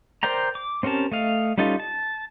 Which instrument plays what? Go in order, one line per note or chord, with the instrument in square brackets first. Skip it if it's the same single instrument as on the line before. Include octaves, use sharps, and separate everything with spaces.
[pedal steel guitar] A#4 C5 D5 G5 A#5
D6
C4 C#4 G4 A#4 A5
A3 D#5 F5
G3 C#4 D#4 F4 A4
A5